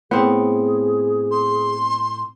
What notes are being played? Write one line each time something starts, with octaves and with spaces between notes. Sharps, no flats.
A2 B3 C4 G#4
C6